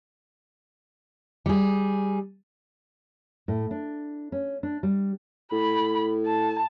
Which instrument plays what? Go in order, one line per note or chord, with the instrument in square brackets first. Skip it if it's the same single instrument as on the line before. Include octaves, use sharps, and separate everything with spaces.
[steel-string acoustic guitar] G3 G#4
[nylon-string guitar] A2
D4
C#4
D4
G3
[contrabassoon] A2 [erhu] B5
[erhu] A5